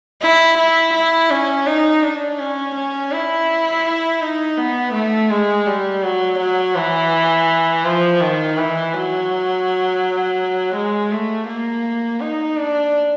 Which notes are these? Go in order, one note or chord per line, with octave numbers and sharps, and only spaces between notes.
E4
E4
E4
C#4
D#4
D4
C#4
C#4
E4
D#4
B3
A3
G#3
G3
F#3
F#3
E3
F3
D#3
E3
F#3
G#3
A3
A#3
D#4
D4